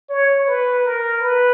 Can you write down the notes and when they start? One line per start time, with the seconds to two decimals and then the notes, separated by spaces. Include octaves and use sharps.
0.10 C#5
0.47 B4
0.85 A#4
1.21 B4